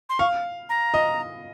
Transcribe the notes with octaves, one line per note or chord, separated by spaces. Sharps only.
C6
F5 C#6
A#5
D#5